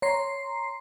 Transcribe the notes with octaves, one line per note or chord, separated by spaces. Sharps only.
C#5 A#5 C6 C7